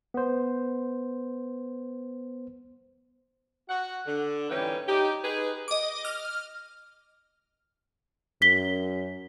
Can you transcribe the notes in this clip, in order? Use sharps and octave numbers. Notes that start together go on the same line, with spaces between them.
B3 C5
F#4 F#5
D3
G#2 E3 G3 C#4 B4 G5
D#4 G4
D#4 G#4 B4
D#5 D6
F6
F#2 B6 G7